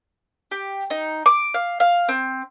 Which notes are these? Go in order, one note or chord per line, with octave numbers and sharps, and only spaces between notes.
G4
D#4
D6
F5
F5
C4